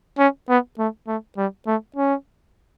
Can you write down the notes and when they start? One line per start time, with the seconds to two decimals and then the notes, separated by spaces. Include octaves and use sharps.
0.18 C#4
0.49 B3
0.79 A3
1.07 A3
1.37 G3
1.67 A3
1.97 C#4